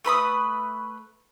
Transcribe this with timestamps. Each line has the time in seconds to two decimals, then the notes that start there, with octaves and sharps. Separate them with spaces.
0.05 A3 B4 B5 D#6